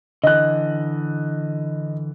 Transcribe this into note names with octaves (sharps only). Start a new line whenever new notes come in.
D3 E3 D#5 F#6